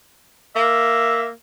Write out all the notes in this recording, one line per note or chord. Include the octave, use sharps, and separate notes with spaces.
A#3 E5